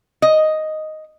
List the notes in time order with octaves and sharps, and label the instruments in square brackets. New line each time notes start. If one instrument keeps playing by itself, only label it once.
[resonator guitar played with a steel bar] D#5